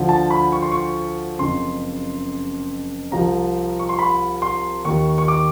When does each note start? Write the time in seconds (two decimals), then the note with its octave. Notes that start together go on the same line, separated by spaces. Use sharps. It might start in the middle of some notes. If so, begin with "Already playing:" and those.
Already playing: D2 D3 F3
0.09 A5
0.31 B5
0.52 C#6
0.62 C6
0.72 C#6
1.39 F#1 F2 C#3 C6
3.12 C2 C3 F3 A#5
3.79 C#6
3.89 C6
3.99 B5
4.42 C6
4.85 D#2 D#3 C#6
5.18 C#6
5.28 D6